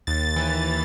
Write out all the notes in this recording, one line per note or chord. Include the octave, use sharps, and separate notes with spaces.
D#2 A6
E3